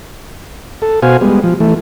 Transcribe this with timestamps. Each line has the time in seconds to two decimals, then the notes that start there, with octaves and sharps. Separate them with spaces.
0.82 A4
1.02 B2 F#4 C5 F5 G#5
1.21 G3 G#3 B3
1.44 F3
1.60 E3 A3